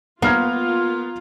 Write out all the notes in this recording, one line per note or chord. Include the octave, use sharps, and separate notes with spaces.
A#3 B3 F4 A#5 F6 G#6